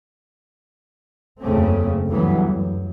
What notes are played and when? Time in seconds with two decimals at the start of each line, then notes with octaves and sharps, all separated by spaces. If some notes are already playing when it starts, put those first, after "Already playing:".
1.42 F#1 E2 C#3 A3 C4 C#4
2.09 D2 G2 E3 F#3 G3 B3
2.46 F#2